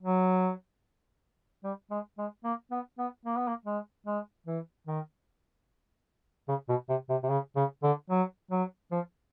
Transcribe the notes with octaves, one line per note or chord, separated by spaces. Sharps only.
F#3
G3
G#3
G#3
A#3
B3
B3
A#3
B3
A#3
G#3
G#3
E3
D#3
C#3
B2
C3
C3
C3
C#3
C#3
D3
F#3
F#3
F3